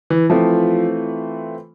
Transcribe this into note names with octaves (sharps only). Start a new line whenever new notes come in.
E3
E3 F3 A3 C4 F4